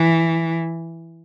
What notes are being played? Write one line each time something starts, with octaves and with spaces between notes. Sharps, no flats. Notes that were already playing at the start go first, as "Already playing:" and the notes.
Already playing: E3